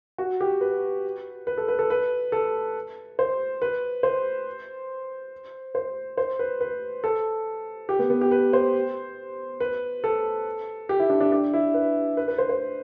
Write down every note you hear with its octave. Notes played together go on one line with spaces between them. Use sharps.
F#4
G4
B4
B4
A4
B4
A4
B4
A4
C5
B4
C5
C5
C5
B4
B4
A4
G4
B3
B3
G4
B4
C5
B4
A4
G4
E4
D4
D4
D4
E4
B4
B4
B4
C5
C5